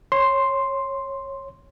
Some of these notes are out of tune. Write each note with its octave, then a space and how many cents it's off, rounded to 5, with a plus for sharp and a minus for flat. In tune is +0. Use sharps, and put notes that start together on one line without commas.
C#5 -15 C6 +0